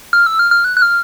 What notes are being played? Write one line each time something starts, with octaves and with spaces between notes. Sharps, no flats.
F6
E6
F6
F6
F#6
F#6
F6